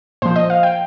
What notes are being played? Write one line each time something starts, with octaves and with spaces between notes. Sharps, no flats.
A#2 F3 C5
D#5
F5
G5